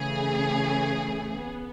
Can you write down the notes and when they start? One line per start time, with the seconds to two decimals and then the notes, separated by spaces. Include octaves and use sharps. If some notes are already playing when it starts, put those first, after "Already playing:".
Already playing: C#3 E3 A3 G#4
1.43 B3